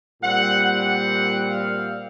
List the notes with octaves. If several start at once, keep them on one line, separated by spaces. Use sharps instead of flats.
A#2 G3 C4 F#5
F#5
F5